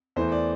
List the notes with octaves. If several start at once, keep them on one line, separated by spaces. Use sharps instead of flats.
E2 E3 A3 C5
D5